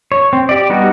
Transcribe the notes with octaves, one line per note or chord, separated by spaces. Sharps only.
C#5
C4
G4 D5
G3 B3 D#4 F#4